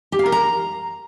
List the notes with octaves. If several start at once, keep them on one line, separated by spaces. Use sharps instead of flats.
G4
F5
A#4
A#5